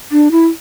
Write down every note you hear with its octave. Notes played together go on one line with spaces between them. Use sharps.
D4
E4